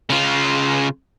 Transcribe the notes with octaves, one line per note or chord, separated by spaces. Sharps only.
C#3 F4